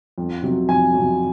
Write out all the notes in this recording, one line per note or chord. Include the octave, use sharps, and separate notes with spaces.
F2
C3 F#3
F2 G#5
C3 F#3